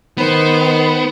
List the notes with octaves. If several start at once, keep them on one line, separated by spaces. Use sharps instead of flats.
D#3 B3 C5 B5